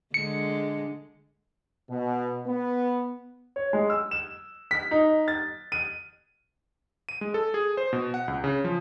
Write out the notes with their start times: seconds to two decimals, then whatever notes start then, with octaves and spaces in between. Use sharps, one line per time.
0.14 D3 G#3 C#7
1.90 B2
2.46 B3
3.56 C#5
3.73 G#3
3.90 E6
4.11 E7
4.71 B6
4.91 D#4
5.28 A6
5.72 D#7
7.09 D#7
7.21 G#3
7.34 A4
7.54 G#4
7.77 C5
7.93 B2
8.14 F#5
8.28 C#2
8.44 C#3
8.64 F3